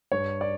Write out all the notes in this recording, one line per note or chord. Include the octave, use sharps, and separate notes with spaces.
G2 C#5
D5